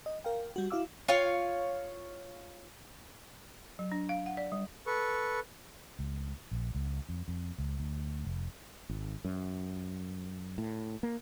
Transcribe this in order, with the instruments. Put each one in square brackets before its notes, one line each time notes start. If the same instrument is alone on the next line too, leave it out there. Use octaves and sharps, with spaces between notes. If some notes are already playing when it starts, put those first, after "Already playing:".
[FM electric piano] D#5
A#4 F5 G5
G3 F#4
E4 F#4 F5 D6 E6
[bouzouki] F4 C#5 F5
[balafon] F#3
D4
F5
F#5
D5
G3
[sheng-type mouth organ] A4 B4 C#6
[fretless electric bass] C#2
A#1
C#2
F2
F2
C#2
D2
F1
G#1
F#2
A2
A#3